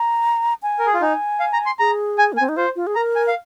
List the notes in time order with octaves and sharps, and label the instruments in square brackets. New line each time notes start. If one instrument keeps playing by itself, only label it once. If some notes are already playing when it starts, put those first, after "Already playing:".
Already playing: [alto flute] A#5
G#5
[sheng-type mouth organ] A#4
G#4
F4
[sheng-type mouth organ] D#4 [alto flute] G#5
[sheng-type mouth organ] F5
A#5
C6
[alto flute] G#4 [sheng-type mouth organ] A#5
[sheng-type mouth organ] G#5
[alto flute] A#3
[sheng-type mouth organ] G#5
[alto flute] C4
D#4
[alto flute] F4 [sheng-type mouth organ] C5
[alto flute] F4
G#4
[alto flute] A#4 [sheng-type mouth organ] A#5
[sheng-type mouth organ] G#5
F5